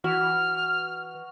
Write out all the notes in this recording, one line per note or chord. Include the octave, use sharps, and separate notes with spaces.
E3 F#4 F6